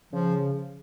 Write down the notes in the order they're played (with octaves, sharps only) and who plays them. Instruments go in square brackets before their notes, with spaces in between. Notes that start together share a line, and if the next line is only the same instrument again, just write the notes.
[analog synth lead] C#3 [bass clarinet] F3